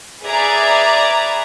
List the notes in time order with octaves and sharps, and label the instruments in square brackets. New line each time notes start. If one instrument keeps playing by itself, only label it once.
[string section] G#4 B4 D5 E5 G#5 A#5